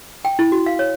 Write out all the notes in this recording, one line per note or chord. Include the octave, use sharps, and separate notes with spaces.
G5
E4
F#4
F5
C#5